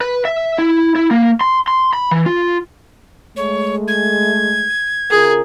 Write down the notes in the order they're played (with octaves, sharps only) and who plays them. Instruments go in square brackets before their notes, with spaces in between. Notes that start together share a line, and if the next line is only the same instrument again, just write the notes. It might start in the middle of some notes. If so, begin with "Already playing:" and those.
[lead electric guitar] B4
E5
E4
E4
A#3
C6
C6
B5
E3
F4
[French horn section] G#3 A3 [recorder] C#5
[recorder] G#6
[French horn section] C#3 F4 A#4 [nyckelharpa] G#4